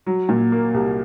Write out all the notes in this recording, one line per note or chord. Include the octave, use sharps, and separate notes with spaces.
F#3
A#2
A#3
C2